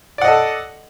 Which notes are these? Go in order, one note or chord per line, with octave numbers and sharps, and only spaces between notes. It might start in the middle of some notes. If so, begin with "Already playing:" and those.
A4 D5 D#5 F#5